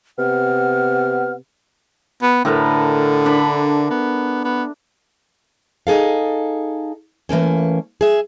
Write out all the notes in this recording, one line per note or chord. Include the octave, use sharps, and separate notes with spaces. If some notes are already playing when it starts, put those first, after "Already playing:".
C3 B3 F#5 F6
B3
A2 D3 A#4 B4
D4 A#4 B5
B3
B3
D#4 G#4 A4 F5
E3 A3 A#3 C#4
G#4 E5